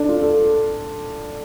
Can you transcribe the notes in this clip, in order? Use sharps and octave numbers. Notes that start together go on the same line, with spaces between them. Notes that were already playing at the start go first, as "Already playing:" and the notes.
Already playing: D4 A4
F4
A4